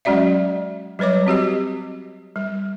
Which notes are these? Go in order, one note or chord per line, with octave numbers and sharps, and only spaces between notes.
F#3 G#3 C#4 F#4 D5 E5
F#3 G3 B4 C#5 D6
C4 F#4 G4 D#5
G3